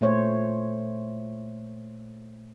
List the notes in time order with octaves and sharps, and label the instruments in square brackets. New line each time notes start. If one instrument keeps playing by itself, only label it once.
[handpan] A#2 A3 C5 C#5